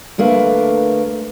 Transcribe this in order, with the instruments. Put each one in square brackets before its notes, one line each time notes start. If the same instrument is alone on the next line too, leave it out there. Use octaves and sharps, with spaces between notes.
[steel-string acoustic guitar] D2 A3 A#3 B4